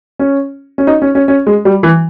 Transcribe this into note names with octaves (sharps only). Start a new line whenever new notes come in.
C#4
C#4
D#4
C#4
C#4
C#4
G#3
G3
E3